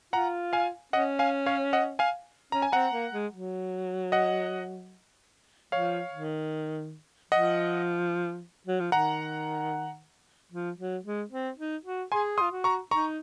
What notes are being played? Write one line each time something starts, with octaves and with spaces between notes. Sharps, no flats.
F4 F#5 A#5
F5 G#5
C#4 D#5 F#5
F5 G#5
C#5 F5
D#5 F#5
F5 G#5
C#4 A#5
G#5
C4 F#5 A#5
A#3
G#3
F#3
D#5 F#5
F3 C#5 F5
D#3
F3 D#5 F#5
F#3
F3
D#3 F#5 A#5
F3
F#3
G#3
C4
D#4
F#4
G#4 G#5 C6
C6 D#6
F4
F#4
A#5 C#6
D#4 A#5 C#6